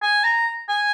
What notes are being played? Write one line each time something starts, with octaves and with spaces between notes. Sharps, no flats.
G#5
A#5
G#5